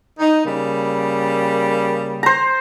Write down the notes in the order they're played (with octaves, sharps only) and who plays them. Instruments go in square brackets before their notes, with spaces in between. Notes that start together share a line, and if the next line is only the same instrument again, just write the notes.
[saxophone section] D#4
C#3 G3 A#3
[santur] C5 A#5